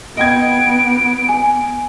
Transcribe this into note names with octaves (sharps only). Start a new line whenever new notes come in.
B3 D#5 G5 G#6 D7
G#5